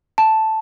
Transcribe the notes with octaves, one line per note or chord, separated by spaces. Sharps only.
A5